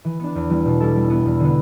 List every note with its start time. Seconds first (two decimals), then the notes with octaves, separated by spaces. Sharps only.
0.05 E3
0.20 B3 D4
0.35 E2
0.50 E3 G3 B3 E4
0.66 B2
0.80 G3 E4 A4 E5
0.96 G3
1.10 B3 E4
1.25 E2
1.40 D3 B3